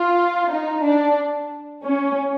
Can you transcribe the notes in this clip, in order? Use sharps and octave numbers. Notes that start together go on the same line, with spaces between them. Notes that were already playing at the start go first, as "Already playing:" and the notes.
Already playing: F4
D#4
D4
C#4